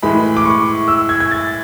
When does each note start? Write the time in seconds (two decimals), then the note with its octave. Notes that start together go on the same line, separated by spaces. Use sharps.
0.02 A2 E3 G#3 B5
0.37 D6
0.45 C#6
0.88 E6
1.09 G#6
1.20 G#6
1.31 A6